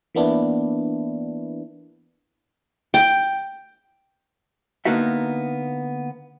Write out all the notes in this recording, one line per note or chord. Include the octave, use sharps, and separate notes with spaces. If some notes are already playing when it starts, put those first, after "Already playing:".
E3 A#3 B3 D4 E4
G5
D3 A#3 B3 D#4 F#4 E5